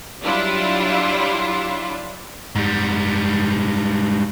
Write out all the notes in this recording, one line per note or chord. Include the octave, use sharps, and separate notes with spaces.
F#3 G3 D4 E4 F4
G#2 G3